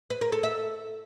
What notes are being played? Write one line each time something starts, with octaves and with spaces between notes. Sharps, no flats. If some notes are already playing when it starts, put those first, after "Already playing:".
B4
A#4
A4
E5